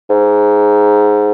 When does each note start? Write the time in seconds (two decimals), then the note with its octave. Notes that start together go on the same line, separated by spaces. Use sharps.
0.10 G#2